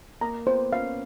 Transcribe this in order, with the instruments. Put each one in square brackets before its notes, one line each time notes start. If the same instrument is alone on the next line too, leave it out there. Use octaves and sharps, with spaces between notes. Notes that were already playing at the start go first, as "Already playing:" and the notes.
[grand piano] A#3 [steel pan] A#5
[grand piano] B3 [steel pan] C5
[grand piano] C#4 [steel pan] F5